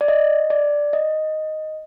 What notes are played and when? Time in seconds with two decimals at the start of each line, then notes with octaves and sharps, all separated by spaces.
0.01 D5
0.08 D#5
0.50 D5
0.93 D#5